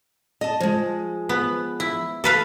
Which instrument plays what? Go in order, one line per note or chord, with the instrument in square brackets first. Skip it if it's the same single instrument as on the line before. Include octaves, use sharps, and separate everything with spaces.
[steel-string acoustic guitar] D#5 A5
F3 G#3
[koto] B3
E4
A4 B4 F5